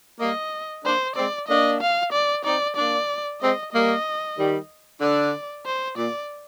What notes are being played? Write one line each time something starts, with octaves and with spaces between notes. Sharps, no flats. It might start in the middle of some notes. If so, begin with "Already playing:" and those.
G3 A#3 D#5
A#3 D4 C5
G#3 C4 D5
A#3 D4 D#5
F5
D5
C4 D#4 D5
A#3 D4 D5
G#3 C4 D#5
G3 A#3 D#5
D#3 G3
D3 D5
C5
A#2 D5